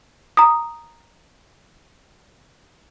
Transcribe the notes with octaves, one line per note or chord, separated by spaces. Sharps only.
A#5 D#6